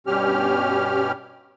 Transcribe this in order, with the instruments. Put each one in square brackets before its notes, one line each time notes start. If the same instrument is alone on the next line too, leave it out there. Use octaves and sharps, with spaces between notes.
[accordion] G2 B2 G3 C#4 G4 F6